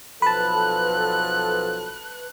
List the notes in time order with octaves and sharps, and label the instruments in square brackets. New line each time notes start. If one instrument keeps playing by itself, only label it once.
[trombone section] B1 F3 A4 [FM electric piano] B4 A5 [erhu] F#6